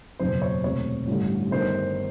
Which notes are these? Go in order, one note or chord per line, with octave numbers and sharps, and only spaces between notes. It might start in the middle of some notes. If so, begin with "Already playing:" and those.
F#1 E2 B2 F#3 B3 C5
C#5
E1 D2 C3 C#5
A1 G2 D3
G1 G2 D#3 C5